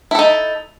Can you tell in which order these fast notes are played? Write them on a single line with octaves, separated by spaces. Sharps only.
E4 A4 D#4